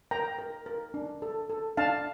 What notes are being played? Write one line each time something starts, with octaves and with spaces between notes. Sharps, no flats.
A#4 G5 A#5
A#4
A#4
D4
A4
A4
D4 F5 A5